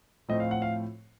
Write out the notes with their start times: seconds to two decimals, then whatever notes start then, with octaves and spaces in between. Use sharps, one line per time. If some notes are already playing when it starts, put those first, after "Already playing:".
0.29 A2 F3 A3 C4 D#5
0.40 F5
0.51 F#5
0.62 F5